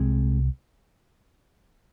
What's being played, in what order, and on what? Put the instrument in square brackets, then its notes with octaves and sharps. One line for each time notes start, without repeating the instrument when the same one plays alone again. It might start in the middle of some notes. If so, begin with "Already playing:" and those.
Already playing: [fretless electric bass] C2 C3 G#3 C4